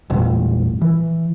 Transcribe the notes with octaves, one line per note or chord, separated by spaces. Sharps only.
E1 A1 G2 A#2
E3